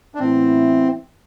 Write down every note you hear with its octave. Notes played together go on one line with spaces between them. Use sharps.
D4
A2 E3 B3 C4 E4